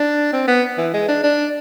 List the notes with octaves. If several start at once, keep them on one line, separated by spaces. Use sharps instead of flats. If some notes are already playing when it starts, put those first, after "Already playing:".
Already playing: D4
C4
B3
E3
G#3
D4
D4